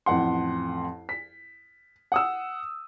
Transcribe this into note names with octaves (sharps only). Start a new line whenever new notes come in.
A1 F2 F#5 C6
B6
F#5 D#6 E6